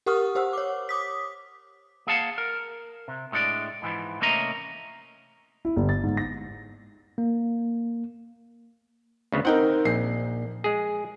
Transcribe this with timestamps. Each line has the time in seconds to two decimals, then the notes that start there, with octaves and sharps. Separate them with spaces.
0.06 G4 A#4 F#5 C#6 D#6 F6
0.35 G4 C5 F#5 E6
0.53 C#5 D6
0.89 D6 D#6 B6
2.07 A#3 G#4 F5 F#5 A5
2.38 A#4
3.08 C3
3.32 A2 G#3 D4 C#5 D5
3.82 G#2 E3 F3
4.21 C3 A3 A#3 C#4 D#5 A#5
5.65 E4
5.76 G1
5.89 A6
6.04 G#2
6.17 A#6
7.18 A#3
9.32 D2 C#3 B3
9.45 C4 D#4 A#4 F#5 G5
9.85 A#1 C7
10.64 G#3 G#4